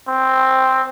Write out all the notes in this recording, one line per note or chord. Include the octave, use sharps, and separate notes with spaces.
C4